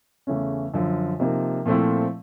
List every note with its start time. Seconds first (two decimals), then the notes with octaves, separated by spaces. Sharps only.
0.27 E2 C#3 E3 A3 C#4
0.74 F#2 D3 F3
1.20 C3 F3 A#3 D#4
1.66 A#2 F3 A3 C4 E4